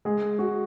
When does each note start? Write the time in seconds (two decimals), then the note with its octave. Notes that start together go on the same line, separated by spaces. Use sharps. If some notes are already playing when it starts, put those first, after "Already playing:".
0.05 G#3 G#4
0.39 F#4